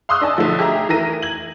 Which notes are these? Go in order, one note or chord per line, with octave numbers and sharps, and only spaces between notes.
F5 C6 C#6 D#6 E6 F#6
D4 D#5 G#5 A5
B1 D3 F3 A3
G4 G#4 D#5 E5 A#5
E3 A3 A#4 A#6 D#7
G#6 F#7